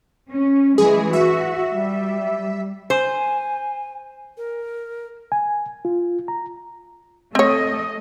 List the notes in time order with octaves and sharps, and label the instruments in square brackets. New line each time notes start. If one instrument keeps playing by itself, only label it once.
[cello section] C#4
[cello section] E3 G#3 [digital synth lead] G#4
[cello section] F#4 [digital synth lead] E5
[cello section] G3
[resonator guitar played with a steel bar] C5 [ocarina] G#5
[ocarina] A#4
[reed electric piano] G#5
F4
A#5
[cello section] A3 D#5 [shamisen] C4 C#5